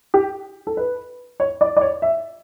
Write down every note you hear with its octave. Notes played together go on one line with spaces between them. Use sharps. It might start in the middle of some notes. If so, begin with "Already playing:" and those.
G4
A4
B4
C#5
D5
D5
C#5
E5